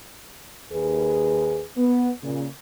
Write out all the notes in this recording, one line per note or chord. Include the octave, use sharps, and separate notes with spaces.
D#2 G#4 B4
B3
A#2 C#3